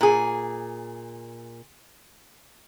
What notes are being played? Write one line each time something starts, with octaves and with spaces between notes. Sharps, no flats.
A#2 G#4